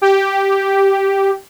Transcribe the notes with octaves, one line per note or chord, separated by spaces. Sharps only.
G4